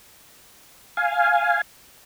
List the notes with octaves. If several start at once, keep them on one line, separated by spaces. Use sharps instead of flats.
F5 G#5